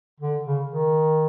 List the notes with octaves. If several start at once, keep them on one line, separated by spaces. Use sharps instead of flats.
D3
C#3
D#3